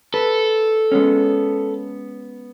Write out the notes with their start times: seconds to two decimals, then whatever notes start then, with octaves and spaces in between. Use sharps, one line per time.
0.14 A4 B4
0.92 G#3 B3 C#4